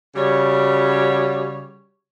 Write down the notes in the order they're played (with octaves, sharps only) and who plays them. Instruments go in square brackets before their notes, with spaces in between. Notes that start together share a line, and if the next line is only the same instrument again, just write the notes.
[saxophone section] C#3 G3 F#4 C#5